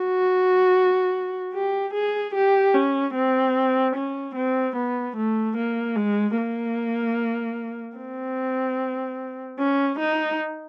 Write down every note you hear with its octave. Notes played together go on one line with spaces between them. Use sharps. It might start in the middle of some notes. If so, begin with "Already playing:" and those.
Already playing: F#4
G4
G#4
G4
C#4
C4
C#4
C4
B3
A3
A#3
G#3
A#3
C4
C#4
D#4